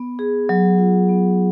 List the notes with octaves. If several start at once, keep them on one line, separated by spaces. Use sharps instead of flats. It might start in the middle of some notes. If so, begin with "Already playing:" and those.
Already playing: B3
G#4
F#3
F4
B3